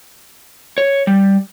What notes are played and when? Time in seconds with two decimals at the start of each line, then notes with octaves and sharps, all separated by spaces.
0.78 C#5
1.07 G3